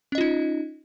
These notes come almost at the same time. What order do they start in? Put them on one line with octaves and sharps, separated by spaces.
C#4 D#5 F4 D#4